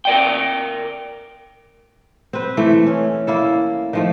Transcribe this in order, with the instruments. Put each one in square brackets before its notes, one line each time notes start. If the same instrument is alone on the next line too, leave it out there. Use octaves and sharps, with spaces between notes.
[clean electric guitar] A#4 D5 G5
[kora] C4 B4
E3 A3
C#4
A#3 E4 A4
D#3 F3 A3